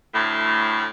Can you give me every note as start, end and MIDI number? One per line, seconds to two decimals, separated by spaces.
0.12 0.86 38
0.12 0.86 45